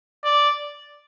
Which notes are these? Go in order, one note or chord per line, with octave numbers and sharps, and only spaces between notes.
D5